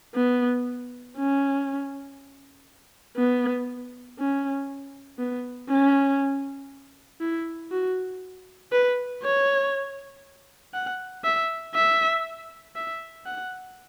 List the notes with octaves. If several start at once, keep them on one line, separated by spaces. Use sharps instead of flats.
B3
C#4
B3
C#4
B3
C#4
E4
F#4
B4
C#5
F#5
E5
E5
E5
F#5